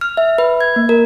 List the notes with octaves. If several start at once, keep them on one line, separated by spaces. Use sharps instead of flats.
F6
E5
B4
G#6
A#3
A#4